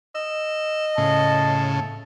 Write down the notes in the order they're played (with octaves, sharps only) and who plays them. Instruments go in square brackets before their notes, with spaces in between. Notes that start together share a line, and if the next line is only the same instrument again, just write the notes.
[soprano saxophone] D#5 [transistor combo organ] E6
[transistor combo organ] A2 C#3 [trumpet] A5